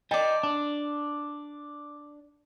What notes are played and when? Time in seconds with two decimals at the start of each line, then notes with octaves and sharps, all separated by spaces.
0.11 D5 D#5 G5 A5
0.43 D4